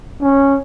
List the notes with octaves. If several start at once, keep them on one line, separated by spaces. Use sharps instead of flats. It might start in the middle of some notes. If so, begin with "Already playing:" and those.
C#4